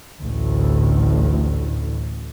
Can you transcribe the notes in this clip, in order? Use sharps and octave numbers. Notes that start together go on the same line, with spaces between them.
A1 D2 A2